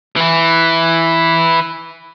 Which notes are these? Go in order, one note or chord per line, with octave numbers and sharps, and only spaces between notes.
E3 E4